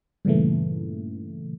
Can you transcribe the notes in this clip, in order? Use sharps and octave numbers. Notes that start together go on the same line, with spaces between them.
G2 A#2 C#3 E3 A3